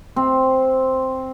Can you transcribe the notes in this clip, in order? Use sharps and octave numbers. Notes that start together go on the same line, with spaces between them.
C4